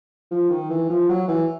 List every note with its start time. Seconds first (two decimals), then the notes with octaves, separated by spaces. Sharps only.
0.31 F3
0.50 D#3
0.70 E3
0.89 F3
1.09 F#3
1.28 E3